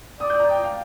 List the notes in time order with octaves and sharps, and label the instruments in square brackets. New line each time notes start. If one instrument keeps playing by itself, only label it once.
[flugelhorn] D5 [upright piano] D#6
[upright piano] G6
A#5
G5
F5